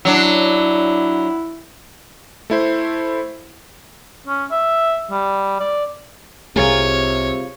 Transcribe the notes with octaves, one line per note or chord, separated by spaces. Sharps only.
F#3 D4 E4
A3 E4 C5
C#4
E5
G3
D5
C2 C3 A3 F4 G#4 A#4 C#5